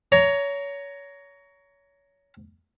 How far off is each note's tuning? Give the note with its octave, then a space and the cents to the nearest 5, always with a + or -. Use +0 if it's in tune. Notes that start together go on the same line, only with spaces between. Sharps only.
C#5 +25 A#5 +0